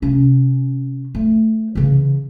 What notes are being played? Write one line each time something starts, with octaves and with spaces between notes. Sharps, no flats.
C3 C#4
A3
C#3 E3